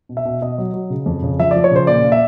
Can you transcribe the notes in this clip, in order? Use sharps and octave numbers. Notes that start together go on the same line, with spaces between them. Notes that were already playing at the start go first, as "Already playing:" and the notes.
B2
E5
B2
B2 D#5
F#3
F#3
C#3
F2
C#3
F3 E5
F3 D5
C#5
C#3 C5
A#2 D5
A#2
E5